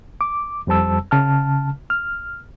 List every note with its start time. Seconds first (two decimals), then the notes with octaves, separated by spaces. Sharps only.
0.21 D6
0.67 F2 G3 C5 A5 E6
1.11 C#3 A5 F6
1.90 F6